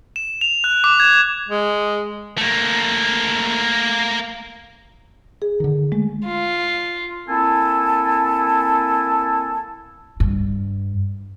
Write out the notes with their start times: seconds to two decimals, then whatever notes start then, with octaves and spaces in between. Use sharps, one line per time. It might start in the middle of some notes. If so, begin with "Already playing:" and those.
0.16 E7
0.41 F7
0.64 F#6
0.84 D6
1.00 G#6
1.49 G#3
2.38 A3 A#3
5.42 G#4
5.60 D3 D#3
5.92 G#3 A3
6.26 F4
7.28 A#3 C4 E4 A4 G#5 A5
10.20 G2